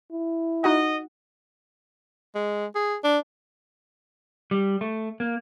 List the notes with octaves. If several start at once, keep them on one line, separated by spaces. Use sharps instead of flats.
E4
D#4 F#4 D#5 F#5
G#3
G#4
D4
G3
A3
A#3